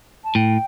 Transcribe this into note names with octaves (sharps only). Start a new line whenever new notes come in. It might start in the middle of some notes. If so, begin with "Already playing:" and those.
A5
A2 G5